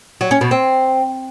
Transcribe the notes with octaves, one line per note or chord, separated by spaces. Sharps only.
F#3
C#4
B2
C4